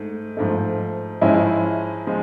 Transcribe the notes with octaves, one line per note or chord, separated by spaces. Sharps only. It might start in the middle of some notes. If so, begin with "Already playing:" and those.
Already playing: G#2 A3
G#2 F3 A3
G#2 F3 G#3 C#4 E4
F3 G#3